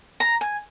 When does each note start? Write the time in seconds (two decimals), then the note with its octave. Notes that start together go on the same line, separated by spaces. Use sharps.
0.20 A#5
0.41 G#5